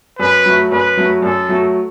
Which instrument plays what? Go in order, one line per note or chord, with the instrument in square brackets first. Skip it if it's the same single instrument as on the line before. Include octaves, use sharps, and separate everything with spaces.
[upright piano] F#2 [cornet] B4
[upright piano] F#3 A3
[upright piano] F#2 [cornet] B4
[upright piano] F#3 A3
[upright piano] F#2 [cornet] A4
[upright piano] F#3 A3